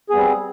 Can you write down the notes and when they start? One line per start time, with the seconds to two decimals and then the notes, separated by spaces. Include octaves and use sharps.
0.10 G#4
0.12 B3
0.15 G3
0.17 C4